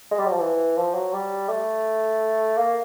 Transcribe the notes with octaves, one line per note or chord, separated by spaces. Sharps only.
G#3
G3
F#3
F3
E3
F3
F#3
G3
A3
A#3